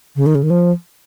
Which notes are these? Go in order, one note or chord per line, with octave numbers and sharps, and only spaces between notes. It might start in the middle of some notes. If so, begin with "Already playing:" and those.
C#3
D#3
C#3
D#3
F3